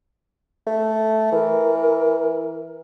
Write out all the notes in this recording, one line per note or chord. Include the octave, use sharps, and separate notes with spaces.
A3
E3 A#4